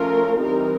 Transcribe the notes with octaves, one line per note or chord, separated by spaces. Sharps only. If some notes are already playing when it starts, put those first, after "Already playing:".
Already playing: F3 A3 C#4 F4 A#4
E3 G3 C4 D#4 A#4